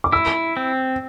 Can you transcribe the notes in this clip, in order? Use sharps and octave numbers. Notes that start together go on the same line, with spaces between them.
D6
E4 E6
C4